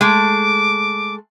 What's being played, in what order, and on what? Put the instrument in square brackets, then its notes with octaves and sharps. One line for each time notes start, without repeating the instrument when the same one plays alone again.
[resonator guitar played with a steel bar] G#3 A3 [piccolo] D6